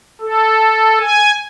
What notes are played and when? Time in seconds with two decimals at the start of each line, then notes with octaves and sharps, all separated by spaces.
0.21 A4
1.00 G#5